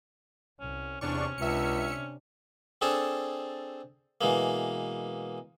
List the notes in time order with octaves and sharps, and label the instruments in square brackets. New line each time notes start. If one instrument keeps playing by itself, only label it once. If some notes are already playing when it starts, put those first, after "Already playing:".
[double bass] C2 [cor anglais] C#4
[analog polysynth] E2 D4 C#6 [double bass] C3 [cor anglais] C#4
[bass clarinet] C#2 [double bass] C3 D4 [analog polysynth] E5 C#7
[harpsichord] C4 D4 G#4 A4 A5
B2 E3 G#3 A#3